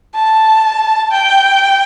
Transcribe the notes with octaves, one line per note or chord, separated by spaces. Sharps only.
A5
G5